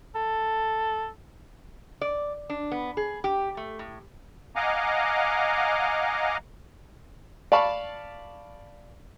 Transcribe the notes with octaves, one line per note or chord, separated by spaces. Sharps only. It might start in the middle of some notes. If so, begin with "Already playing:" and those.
A4
D5
D4
B3
G#4
G4
A3
A2
D#5 F5 F#5 G#5 A#5 D6
D5 F5 A5 B5 C#6